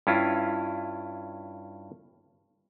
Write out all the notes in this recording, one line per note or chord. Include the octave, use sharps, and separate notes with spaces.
G2 C#4 E4 F4